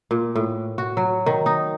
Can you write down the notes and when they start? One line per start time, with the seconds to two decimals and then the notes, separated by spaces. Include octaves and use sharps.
0.11 A#2
0.35 A2
0.78 F#4
0.97 F#3
1.26 D#3
1.46 D#4